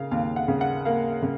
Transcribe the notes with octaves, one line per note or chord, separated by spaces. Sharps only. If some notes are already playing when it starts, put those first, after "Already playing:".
Already playing: C#3 A#3 F5
D#2 F5
F#5
C#3
F#5
A#3 F5
C#3